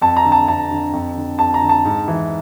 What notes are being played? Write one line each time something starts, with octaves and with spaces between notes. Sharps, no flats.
F2 A5
A#5
D3
A5
F2 A5
D3
F2
D3
F2 A5
A#5
D3
A5
G#2
E3